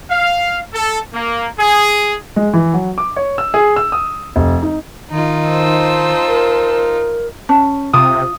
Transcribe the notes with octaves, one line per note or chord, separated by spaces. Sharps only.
F5
A4
A#3
G#4
G#3
E3
F#3
D6
C#5
E6
G#4
E6
D#6
F1
D#4
D#3 D#4 F4
C5 A5 E6
A#4
C#4 A5
C3 F4 D#6